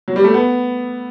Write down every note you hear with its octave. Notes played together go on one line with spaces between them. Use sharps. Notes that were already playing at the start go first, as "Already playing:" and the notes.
F#3
G3
A3
B3